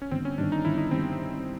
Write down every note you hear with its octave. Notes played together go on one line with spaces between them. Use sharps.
C#4
G1 C4
C#4
G2 D#3 G3 D4
D#4
G1 E4
D#4
D#3 G3 C4